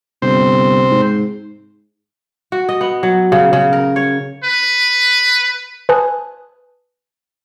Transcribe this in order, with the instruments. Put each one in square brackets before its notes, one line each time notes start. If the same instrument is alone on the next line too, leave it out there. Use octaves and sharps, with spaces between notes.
[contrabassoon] G1 [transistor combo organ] C3 C5
[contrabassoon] G#2
[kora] F#4
D#5
B3
F#3
C#3
C#3
A#4
C#5
[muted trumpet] B4
[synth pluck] B4 G#5 A5 D#6 F#6